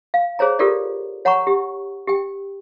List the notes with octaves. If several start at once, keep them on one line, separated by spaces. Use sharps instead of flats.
F5
G#4 C5 C#5 A#5
F4 G4 A4 A#4 D5
C#5 F#5 A#5 B5 C#6
G4
G4 G5